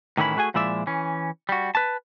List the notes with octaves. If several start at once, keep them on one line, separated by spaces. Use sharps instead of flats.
A2 D#3 E3 C#4 E4 B5
A3 F#4 G#4 G#5
A#2 F3 G#3 E4 D5 E5
E3 C#4
G3 F#4
B4 A5